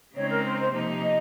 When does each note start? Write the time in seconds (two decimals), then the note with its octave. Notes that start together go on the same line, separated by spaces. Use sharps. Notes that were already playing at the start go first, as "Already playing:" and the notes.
0.15 C#3 G#3 C4 D#4 C#5
0.30 A#4
0.45 C5
0.59 C5
0.73 C3 F3 A#3 D#4
1.02 D#5